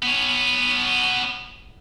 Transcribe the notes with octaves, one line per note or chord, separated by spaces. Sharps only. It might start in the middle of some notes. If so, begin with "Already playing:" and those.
B3 C#5